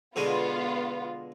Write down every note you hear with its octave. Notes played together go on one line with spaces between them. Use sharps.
B2 D3 G#3 B3 F4